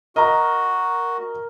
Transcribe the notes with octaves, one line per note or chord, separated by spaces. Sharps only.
F#4 A#4 D#5 A#5